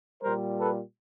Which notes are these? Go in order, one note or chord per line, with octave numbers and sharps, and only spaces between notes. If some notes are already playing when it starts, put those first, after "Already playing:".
A#2 G3 A#4 C5
A4 B4